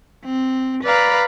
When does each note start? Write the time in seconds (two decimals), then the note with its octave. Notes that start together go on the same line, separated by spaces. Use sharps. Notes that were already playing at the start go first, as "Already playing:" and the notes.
0.25 C4
0.84 B4 D5 F5 A#5 B5